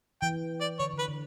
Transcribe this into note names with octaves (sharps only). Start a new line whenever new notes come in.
E3 G5
D5
D3 C#5
D3
B4
D3